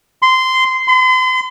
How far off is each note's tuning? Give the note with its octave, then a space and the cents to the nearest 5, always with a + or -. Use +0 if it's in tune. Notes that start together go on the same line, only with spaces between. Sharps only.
C6 -15
C6 -40